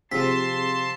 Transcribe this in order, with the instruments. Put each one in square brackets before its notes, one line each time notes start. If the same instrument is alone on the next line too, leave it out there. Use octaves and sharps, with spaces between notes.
[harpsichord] C3 F3 [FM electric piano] C4 F4 G#4 [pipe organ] A5 C6 [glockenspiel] B6